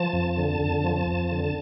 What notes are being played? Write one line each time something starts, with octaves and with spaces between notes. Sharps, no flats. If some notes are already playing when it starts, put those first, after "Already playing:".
Already playing: F3 A5
F2
D3
F2
F3
F2
D3